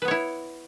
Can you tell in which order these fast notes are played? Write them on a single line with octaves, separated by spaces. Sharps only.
B4 B3 C#5 E4